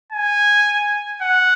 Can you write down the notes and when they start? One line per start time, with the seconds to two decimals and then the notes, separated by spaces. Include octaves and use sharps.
0.12 G#5
1.21 F#5